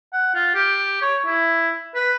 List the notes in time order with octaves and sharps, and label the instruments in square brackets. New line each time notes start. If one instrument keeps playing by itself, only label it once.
[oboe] F#5
F4
G4
C#5
E4
B4